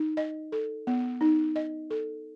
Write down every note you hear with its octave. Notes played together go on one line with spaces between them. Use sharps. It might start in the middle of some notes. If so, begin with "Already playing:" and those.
Already playing: D#4
D#5
A4
B3
D#4
D#5
A4